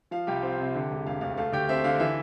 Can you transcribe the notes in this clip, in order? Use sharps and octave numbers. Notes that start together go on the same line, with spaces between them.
F3 F5
C2 G4 G5
C4
C3
D3
E1
E1 F5
D2 F5
A3 F5
D2 G4 G5
C4 E5
D3 F5
E3 E5